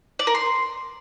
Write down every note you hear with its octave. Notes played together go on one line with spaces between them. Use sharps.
D5
A#4
C6